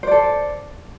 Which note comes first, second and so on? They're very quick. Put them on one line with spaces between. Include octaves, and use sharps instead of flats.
C5 D5 A4